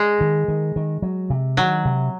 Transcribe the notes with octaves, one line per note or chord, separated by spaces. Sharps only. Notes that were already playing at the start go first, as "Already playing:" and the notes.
Already playing: G#3
D#3
D#3
D#3
F#3
C3
D#3 F#3
C3